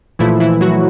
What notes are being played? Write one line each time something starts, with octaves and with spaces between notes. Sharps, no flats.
A#2 E3 F3 A3 E4
E3 E4
F#3 F#4